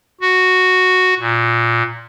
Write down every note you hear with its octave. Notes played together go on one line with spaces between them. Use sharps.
F#4
A#2